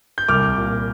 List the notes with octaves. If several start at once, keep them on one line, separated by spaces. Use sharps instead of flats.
G6
C2 D6 F6
A#2